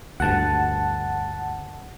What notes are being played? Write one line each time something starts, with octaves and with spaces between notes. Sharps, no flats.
D2 G2 F#5 A5